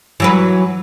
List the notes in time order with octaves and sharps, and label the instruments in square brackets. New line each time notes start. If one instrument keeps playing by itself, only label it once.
[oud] E3 F#3 B4